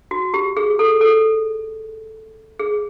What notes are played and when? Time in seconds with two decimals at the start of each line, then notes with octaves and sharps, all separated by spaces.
0.11 F#4
0.34 G4
0.57 G#4
0.79 A4
1.01 A4
2.59 G#4